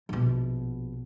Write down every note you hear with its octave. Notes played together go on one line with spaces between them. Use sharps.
A#1 B2